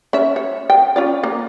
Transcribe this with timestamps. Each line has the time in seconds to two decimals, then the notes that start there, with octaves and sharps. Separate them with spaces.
0.13 C#4 E5
0.36 C#5
0.70 G5
0.96 C#4 F4 D5
1.23 A#3